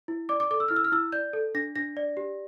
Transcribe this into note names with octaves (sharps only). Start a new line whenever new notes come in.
E4
D5 D6
D6
A4 D6
E6
E4 F6
E6
F6
E4 E6
D5 G6
A4
D4 A#6
D4 A#6
D5
G4